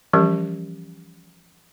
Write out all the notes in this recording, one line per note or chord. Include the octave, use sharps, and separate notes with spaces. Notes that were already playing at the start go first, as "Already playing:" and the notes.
E3 F3 G3 C#4 G4 A#4